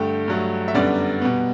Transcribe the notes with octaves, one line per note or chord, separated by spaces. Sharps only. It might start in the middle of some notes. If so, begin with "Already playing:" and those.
Already playing: G2 D3 A3 G5
G2 F#3 A3
E5
F#2 D3 G3 B3 D5
B2 G3 B3